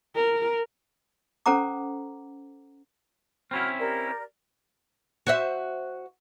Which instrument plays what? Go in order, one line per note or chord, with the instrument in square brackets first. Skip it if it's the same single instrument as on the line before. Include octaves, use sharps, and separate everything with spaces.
[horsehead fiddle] A#4
[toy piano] C#4 A4 C5 F#5 A#5 D6
[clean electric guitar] C4 C#4 E4 [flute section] F#4 B5 F6
[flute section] G4 A#4 D5
[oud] F#4 C5 E5